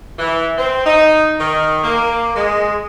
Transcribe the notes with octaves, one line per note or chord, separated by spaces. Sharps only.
E3
C4
D#4
D#3
A#3
G#3